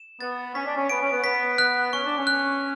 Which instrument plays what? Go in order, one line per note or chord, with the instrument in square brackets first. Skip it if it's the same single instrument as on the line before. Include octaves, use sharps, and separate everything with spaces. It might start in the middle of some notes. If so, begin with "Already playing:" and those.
Already playing: [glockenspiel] E7
[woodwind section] B3 [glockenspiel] A6
[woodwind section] C#4 [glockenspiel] B6
[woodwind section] D4
C#4
[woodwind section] B3 [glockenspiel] D7
[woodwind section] C#4
B3
[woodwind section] B3 [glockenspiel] B6
[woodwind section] B3 [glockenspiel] F#6
[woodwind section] C#4 [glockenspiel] C#6
[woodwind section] D4
C#4
[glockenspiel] F#6